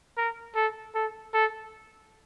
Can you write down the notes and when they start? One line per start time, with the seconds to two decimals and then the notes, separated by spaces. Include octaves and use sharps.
0.17 A#4
0.55 A4
0.95 A4
1.34 A4